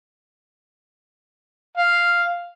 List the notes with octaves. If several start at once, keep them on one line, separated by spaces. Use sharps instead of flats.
F5